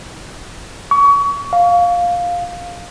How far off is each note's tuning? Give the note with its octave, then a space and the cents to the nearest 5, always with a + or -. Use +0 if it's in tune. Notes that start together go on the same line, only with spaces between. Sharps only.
C#6 +30
F5 +10